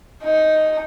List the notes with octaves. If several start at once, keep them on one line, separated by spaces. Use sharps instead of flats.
D#4